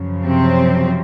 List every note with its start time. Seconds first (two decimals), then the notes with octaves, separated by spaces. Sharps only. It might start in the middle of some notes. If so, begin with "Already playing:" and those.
Already playing: F#2 C#3 F3
0.24 C3 C4